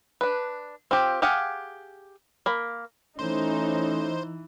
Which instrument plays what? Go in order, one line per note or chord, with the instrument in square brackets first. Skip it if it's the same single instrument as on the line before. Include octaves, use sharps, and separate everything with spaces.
[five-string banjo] D4 B4
C4 F4 G4
G4 G#4 F5 F#5 G#5
A#3 B5
[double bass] E3 [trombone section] A3 C#4 [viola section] D#4 [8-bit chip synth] C5